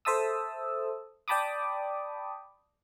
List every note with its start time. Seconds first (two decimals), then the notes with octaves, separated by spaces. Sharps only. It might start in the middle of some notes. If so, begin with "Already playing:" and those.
0.05 A4 C5 E5 A5 D#6 E6
1.28 D5 G5 A5 B5 D6 D#6